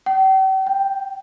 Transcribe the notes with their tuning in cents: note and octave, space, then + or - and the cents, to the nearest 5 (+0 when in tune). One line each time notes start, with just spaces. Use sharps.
G5 -40
G5 +5